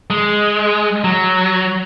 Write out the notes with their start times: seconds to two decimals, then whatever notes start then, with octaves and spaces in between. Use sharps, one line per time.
0.10 G#3
1.04 F#3